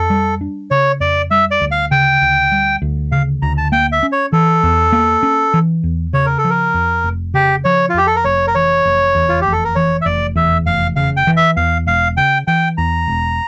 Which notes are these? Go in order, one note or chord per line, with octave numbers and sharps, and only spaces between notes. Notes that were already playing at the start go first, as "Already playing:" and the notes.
Already playing: F2 A4
G3
D4
C#3 C#5
F2 D5
G3 E5
D5
D2
F5
C#3 G5
D2
G3
D2
C#3 F5
D2 A#5
A5
A#3 G5
E5
C#4
C#5
E3 A4
E2
A#3
C#4
E3
E2
C#3 C#5
A#4
A4
F3
A#4
F2
F1
C#3 G4
F3 C#5
F4
F2 G4
A4
A#4
F1 C#5
A#4
E3 C#5
F1
E2
F4
F1 G4
A4
A#4
E3 C#5
E5
F1 D5
E2 E5
F1 F5
C#3 F5
G5
E3
E5
E2 F5
E1 F5
C#3 G5
E3 G5
E2 A#5
E1